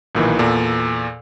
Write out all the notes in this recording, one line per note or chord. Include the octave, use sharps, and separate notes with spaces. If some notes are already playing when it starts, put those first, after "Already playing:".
B1 A#2 D#3 E3
E2 A#2 A4